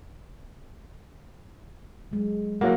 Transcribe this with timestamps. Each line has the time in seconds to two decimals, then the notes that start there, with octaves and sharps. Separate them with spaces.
2.11 F#3 G#3
2.61 F#3 A#3 E4 E5 F#5